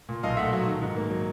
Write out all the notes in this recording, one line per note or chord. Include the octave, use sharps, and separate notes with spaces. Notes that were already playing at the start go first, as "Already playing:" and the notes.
A#2
B1 D#5 F5
A3 E5 F#5
F#3
D#3
G#2
A#3
F#3